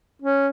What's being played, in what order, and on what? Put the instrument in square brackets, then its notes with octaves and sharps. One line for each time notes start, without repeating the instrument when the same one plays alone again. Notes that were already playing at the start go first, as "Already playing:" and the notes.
[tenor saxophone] C#4